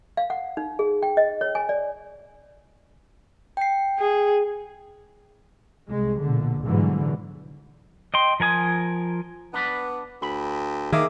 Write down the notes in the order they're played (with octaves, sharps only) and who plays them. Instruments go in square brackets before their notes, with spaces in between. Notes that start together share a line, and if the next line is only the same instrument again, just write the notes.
[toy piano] F5
F#5
D#4
G#4
G5
D#5
C#5
G#5
D5
[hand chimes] G5 C7
[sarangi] G#4
[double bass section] C2 G#3
A#1 B2 D3
G#2 B2 D3 E3 F#3 G3
[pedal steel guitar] D#5 G5 C6
F3 A#4 G#5 D#6
[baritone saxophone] B3 [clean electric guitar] D4 B4 D5
[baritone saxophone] D2 [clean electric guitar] B5
[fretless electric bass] D#3 [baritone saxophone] A#3 [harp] G#4 E5 D6